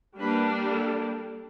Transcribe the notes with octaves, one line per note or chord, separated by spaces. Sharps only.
G3 A#3 D4 B4
A4